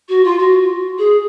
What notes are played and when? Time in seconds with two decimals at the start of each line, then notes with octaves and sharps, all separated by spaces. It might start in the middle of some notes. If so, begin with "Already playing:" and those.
0.08 F#4
0.24 F4
0.38 F#4
0.98 G#4